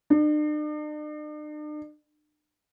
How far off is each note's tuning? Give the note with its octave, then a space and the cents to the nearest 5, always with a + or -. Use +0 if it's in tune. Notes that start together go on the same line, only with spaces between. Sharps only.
D4 +45